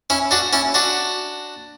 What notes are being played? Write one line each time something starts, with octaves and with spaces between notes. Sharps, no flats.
C#4 E4
D4 F#4
C#4 E4
D4 F#4